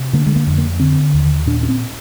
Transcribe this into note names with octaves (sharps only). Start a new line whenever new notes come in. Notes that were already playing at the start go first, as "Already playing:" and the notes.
Already playing: C3
D3 A#3
G#3
A#3
F2
A#3
D3 C4
D#2
A#2 D4
D4
C4